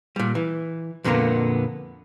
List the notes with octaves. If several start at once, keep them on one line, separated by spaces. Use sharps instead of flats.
A#2 G3
E3
F2 A#2 D3 G3 A#3 B3